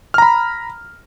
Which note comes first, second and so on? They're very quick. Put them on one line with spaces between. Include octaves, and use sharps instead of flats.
F6 A#5 B5